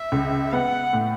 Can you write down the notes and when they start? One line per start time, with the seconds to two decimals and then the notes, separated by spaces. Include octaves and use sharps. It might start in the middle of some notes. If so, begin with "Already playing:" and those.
Already playing: E5
0.12 C#2
0.53 B3 F#5
0.93 A2